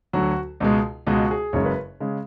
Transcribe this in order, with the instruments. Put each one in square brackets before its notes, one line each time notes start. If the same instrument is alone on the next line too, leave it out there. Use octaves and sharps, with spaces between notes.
[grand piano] D2 D3 F#3 F#4
C#2 B2 G#3
C#2 B2 G#3 F#4
G#4
F#1 F#2 C#3 G#3 C#5
B4
C#3 G#3